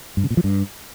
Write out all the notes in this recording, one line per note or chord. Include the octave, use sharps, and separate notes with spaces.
G2
C#3
A#2
F3
G2